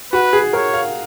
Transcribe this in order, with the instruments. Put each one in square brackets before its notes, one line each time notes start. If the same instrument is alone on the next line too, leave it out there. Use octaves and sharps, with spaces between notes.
[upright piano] F#4 [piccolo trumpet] B4
[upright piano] G#4
[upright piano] A#4 [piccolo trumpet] C#5
[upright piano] F5